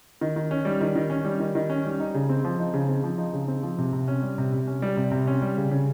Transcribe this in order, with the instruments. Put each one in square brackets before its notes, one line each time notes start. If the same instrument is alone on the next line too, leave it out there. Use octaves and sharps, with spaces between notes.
[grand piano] D#3
D#3
C#4
G3
D#3
D#3
C#4
G3
D#3
D#3
C#4
G3
D#4
C#3
C4
F3
D#4
C#3
C4
F3
D#4
C#3
C4
F3
C3
C3
C#4
G3
C3
C3
C#4
G3
C3
C3
C#4
G3
C#3
C#3